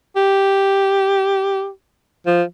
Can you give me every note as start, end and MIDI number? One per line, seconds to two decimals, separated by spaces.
0.16 1.69 67
2.27 2.43 53